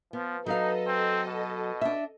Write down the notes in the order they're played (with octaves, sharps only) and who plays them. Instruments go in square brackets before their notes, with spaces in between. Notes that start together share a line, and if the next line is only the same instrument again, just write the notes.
[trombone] F3 [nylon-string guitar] B3
[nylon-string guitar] F#3 B4 F5 [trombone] D#4 [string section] A4 D#5
[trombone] C4
B2
[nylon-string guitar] D4 E5